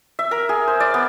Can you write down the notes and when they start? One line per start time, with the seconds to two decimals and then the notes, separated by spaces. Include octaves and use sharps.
0.19 E5
0.31 A#4
0.49 G#4
0.67 C5
0.80 D5
0.94 B3